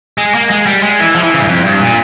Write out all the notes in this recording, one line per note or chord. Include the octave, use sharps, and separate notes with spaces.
G#3
A#3
G#3
G3
G#3
E3
F3
E3
C#3
G2
F2
G2
A#2